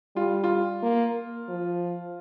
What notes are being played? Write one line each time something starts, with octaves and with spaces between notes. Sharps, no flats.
G3 F4
F4
A#3
F3